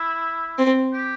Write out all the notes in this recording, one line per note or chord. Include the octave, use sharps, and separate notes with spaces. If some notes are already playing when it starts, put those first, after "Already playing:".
Already playing: E4
C4
G4